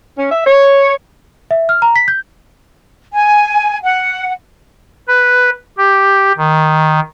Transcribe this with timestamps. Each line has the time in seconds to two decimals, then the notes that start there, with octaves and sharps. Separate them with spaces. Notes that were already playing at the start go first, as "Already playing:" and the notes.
0.18 C#4
0.31 E5
0.46 C#5
1.51 E5
1.69 F6
1.82 A#5
1.96 B6
2.08 G6
3.13 G#5
3.82 F#5
5.08 B4
5.78 G4
6.38 D#3